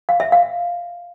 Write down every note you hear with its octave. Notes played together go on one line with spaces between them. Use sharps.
F5
E5
F5